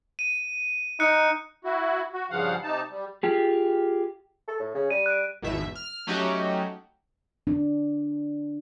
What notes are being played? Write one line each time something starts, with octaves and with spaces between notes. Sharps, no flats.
D#7
D#4 F#6 C#7
E4 F#4
F#4
G2 C#3 F3 F5 F#5
C3 D#4 A5
G3
F4 G4 G#4
A4
A2
C#3
G3 D#7
F#6 D7
G#1 E2 B2 E5
F6
F#3 A3 C#4 D#4 F#4 G4
D4